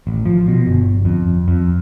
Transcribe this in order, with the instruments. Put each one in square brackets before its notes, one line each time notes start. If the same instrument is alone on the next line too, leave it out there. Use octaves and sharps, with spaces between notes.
[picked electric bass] A1
F3
B2
G1
F2
F2